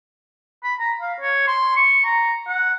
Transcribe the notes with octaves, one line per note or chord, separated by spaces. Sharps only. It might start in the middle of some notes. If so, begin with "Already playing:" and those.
B5
A#5
F5
C#5
C6
C#6
A#5
F#5